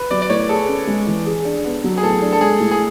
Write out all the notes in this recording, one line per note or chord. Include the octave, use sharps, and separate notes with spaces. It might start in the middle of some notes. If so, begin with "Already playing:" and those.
Already playing: B4
F#3 D5
D5
A2 C#5
G#4 A4
C#4
G#3
E3
G#4
D4
B3
F#3
G#4
A2 A4
D4
A4
G#3 G#4
A2
G#4